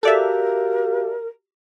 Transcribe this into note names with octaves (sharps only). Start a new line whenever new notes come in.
F#4 G4 A4 A#4 D5 E5 F5